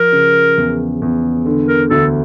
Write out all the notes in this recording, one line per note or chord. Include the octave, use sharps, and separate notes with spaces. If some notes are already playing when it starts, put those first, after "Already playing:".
Already playing: F3 A#4
C#3
E2
E2
D3
A#4
D2 A4